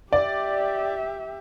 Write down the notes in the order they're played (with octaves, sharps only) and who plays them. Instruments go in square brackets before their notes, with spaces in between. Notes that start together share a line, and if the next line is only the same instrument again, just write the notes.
[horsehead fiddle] G4 E5 [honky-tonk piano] D5